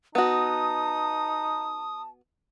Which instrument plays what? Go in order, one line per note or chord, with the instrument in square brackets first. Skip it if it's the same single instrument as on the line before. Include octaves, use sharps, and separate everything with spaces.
[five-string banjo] B3 F#4 [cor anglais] D#4 [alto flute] A5 [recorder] D#6